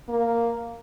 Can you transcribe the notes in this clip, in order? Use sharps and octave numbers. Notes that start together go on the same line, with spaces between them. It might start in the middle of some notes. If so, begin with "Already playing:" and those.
A#3